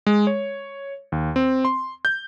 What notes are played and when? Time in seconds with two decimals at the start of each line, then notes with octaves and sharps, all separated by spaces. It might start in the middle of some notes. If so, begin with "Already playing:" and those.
0.07 G#3
0.27 C#5
1.12 D#2
1.36 C4
1.65 C6
2.05 G6